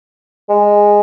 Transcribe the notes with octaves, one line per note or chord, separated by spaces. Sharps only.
G#3